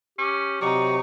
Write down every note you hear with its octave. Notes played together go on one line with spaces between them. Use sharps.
C#4 G4
C3 F#3 D#4 G4 D5 C#6